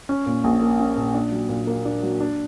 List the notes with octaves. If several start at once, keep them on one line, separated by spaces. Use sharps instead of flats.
C#4
A#2
A#1
A#3
C#4
A#2
D4
F#3
A#2
A#3
D4
F#3
D4